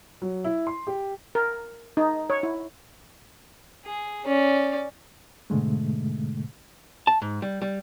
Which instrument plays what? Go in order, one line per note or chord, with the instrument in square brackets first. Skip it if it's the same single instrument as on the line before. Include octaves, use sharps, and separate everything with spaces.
[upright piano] F#3
E4
C6
G4
[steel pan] A#4
D#4
C#5
E4
[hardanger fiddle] G#4
C#4 D5
[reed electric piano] G#2 B2 D3 G#3 A3
[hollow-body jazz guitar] A5
G#2
G3
G3